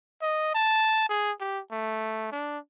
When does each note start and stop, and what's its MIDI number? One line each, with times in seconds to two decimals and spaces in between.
0.21 0.51 75
0.54 1.09 81
1.09 1.31 68
1.40 1.60 67
1.71 2.31 57
2.31 2.58 62